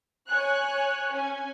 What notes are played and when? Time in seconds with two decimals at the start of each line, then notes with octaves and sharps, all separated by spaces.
0.28 C#5 G#5 F#6
1.12 C#4 G#5